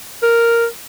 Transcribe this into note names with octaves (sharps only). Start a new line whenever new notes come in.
A#4